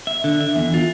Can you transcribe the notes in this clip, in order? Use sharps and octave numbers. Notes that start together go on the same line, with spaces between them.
E5
D3
E5
E2
F4